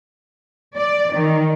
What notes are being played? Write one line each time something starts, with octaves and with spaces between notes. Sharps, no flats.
D5
D#3